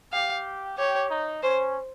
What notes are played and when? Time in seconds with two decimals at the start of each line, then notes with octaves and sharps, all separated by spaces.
0.13 G4 F5
0.78 G4 C#5
1.10 D#4
1.43 C#4 C5